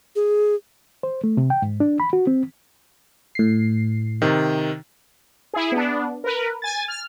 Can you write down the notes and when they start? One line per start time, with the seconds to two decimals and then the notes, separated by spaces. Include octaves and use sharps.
0.16 G#4
1.03 C5
1.24 A3
1.37 C3
1.50 G5
1.62 G#2
1.80 D4
2.00 B5
2.13 F#4
2.27 C4
3.35 A2 C7
4.22 C3 D#3
5.54 E4 G#4
5.72 B3 D4
6.24 A#4 B4
6.62 G#5 A6
6.88 F6